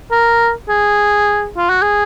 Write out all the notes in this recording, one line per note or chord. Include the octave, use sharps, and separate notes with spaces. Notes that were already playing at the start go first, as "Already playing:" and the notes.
A#4
G#4
F4
F#4
G#4